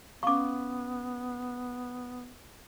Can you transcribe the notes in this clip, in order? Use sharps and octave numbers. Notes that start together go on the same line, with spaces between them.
B3 C#4 F5 C#6 D6